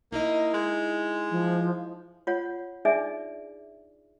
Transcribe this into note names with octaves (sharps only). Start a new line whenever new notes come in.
A#3 D#4 E4 D#5
G#3
F3
F4 C#5 F#5
D4 D#4 G#4 D5 E5